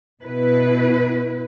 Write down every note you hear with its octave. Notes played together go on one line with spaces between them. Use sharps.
B2 E4 B4